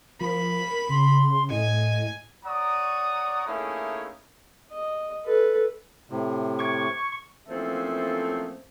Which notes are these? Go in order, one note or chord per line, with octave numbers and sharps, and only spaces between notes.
F3 A#4 B5
C#3 C6
A2 D#5 G#5
C#5 D5 F#5 A#5 C#6 D#6
A3 A#3 C#4 D#4 E4 G#4
D#5
A4 B4
A2 C3
C#6 D6 G#6
E3 F3 A3 A#3 C4 C#4